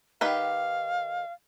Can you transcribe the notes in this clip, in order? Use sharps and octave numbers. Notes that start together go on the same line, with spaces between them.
D#3 G4 B4 F5